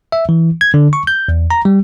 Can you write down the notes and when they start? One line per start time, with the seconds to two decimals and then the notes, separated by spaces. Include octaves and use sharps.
0.12 E5
0.29 E3
0.61 G#6
0.74 D3
0.93 C#6
1.07 G6
1.28 E2
1.51 A#5
1.65 G3